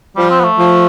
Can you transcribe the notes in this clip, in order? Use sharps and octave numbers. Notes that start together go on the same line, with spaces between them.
F3 G3
C4
B3
A3
F3